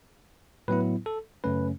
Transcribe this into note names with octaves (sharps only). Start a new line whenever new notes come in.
A2 F#3 B3 E4 B4
A4
F#2 C#3 A3 C#4 B4